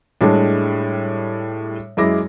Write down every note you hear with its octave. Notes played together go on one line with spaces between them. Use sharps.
A2 G3 G#3 D4
F#2 G#3 E4 D6 A#6